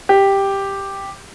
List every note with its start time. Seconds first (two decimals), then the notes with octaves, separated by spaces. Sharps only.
0.09 G4